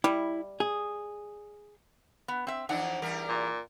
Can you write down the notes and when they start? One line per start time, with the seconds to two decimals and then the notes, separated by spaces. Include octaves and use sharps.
0.04 G3 E4
0.60 G#4
2.28 B3
2.47 C4 E5
2.69 F2 E3 D4 D#4 F#5
3.02 E2 G3 A#4
3.29 A#2